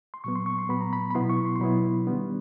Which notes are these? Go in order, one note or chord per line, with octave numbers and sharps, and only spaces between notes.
C6
A#2 F#3 B3 C#6
C6
C#6
C6
A#2 F#3 B3 B5
A#5
B5
B5
B2 F#3 B3 E4 C6
C#6
C6
C6
B2 F#3 B3 E4 B5
D#3 G3 B3 D4